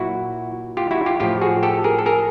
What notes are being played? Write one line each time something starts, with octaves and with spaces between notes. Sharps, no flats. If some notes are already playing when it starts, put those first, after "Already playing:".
Already playing: A#2 F#3 E4 F#4
F4 G4
E4 F#4
F4 G4
A2 F3 F4 G4
F#4 G#4
G4 A4
G#4 A#4
A4
G#4 A#4